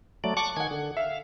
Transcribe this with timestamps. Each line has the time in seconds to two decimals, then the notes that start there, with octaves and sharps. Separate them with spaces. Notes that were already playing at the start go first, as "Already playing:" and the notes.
0.24 F#3 A3 D5
0.37 F#5 A5 C#6 D6
0.57 D#3 F#5 G#5 G#6
0.71 D3
0.97 E5 F5